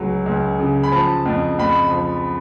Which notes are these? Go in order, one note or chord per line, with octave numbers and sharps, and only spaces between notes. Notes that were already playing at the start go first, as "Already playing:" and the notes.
Already playing: C#2 F#3
C#2
C#3
B5
F3 A5
F2
F2 B5
F3